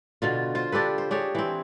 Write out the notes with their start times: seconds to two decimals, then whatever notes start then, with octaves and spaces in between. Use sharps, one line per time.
0.22 B2 D3 F4
0.55 F4 C5
0.72 D4 G4 A4 B4
0.98 C5
1.11 D4 G4 G#4 C#5
1.35 E3 C4